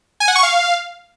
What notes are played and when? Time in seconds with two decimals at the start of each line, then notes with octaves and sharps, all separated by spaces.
0.20 G#5
0.28 F#5
0.36 C#6
0.43 F5